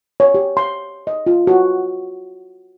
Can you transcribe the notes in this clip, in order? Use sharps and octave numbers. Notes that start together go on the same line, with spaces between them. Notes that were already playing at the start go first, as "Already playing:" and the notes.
C#5
G4
C6
D#5
F4
F#4